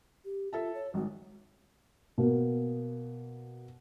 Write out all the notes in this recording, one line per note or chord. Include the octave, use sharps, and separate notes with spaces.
G4
F4 A4 E5 A5
C#5
G#1 G#2 F#4
B2 A#3